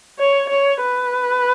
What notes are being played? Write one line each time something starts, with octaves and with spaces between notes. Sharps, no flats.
C#5
C#5
B4